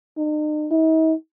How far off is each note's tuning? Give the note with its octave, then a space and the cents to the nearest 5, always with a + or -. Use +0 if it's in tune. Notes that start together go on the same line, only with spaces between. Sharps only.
D#4 -45
D#4 +45